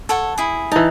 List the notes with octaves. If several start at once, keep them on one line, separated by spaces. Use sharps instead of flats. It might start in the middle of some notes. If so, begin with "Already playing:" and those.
A4 C#5 F#5
E4 G#4
E3 D#4 A5